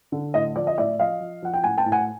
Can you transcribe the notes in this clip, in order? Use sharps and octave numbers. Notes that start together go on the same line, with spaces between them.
D3
A2 D#5
F3 D5
D#5
A2 D5 E5
F3 D#5 F5
F3
F3 F#5
G5
A2 F#5 G#5
G5 A5
A2
F#5 G#5